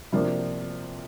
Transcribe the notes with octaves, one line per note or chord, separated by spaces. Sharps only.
C3 F3 A#3 D4